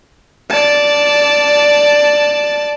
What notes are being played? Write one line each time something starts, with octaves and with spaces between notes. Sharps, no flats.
D5 A5